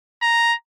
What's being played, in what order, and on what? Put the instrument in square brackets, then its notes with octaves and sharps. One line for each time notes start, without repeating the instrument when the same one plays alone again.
[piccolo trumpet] A#5